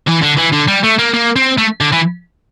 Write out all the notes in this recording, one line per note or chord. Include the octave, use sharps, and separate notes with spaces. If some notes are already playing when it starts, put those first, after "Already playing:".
E3
D3
E3
D3
G3
A3
A#3
A#3
C4
A3
D3
E3